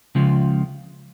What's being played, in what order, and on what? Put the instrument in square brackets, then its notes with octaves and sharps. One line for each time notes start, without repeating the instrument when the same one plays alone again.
[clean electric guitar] C#2 C#3 F3